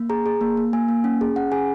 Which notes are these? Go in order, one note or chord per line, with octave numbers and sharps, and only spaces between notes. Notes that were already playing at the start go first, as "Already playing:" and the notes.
Already playing: A#3
G#4 A#5
G#4
A#3
A#3
A#3 G#5
A#3
C#4
G#4
C#4 F#5
G#4 G#5